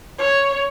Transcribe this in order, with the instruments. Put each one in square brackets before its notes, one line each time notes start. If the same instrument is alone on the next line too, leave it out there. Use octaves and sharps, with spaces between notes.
[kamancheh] C#5